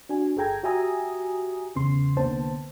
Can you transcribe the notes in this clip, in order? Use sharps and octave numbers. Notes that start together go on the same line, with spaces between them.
D4 F#4 G#5
G1 G#4 A4 G5 A#5 G#6
F#4 G4 E5 G#5 A#5 D#6
E2 C#3 B3 C6
C2 D3 A#3 B3 C5 A5